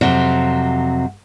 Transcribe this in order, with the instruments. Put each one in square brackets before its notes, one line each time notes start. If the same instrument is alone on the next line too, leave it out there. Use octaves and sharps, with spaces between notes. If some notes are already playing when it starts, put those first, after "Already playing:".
[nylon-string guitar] F2 C3 F#3